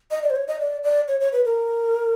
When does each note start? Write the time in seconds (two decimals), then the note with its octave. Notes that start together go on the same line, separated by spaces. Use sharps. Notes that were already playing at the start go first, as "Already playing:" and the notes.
0.11 D#5
0.23 D5
0.30 C5
0.36 C#5
0.48 D#5
0.60 D5
0.83 D5
1.08 C#5
1.20 C#5
1.32 B4
1.45 A#4